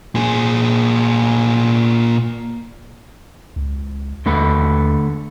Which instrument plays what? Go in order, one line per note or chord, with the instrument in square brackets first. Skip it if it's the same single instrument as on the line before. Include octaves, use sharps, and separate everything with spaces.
[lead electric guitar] A#2 G#4
[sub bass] C#2
[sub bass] D#2 [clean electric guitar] D3 A3 B4